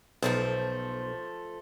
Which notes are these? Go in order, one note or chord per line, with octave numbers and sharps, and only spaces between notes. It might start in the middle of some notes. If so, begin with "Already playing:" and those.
B1 F3 A3 C5